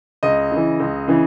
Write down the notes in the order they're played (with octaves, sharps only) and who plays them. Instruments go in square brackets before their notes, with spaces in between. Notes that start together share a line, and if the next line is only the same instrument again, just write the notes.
[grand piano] C#2 D#5
C#3 E3
C#2
C#3 E3